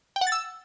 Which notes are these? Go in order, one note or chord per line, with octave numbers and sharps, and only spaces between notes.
G5
F#5
A6
E6